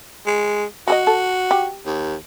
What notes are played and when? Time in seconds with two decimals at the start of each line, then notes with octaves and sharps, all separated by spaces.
0.27 G#3
0.88 F#3 F#4 G#4 D#5
1.07 A4
1.51 G4
1.86 D#2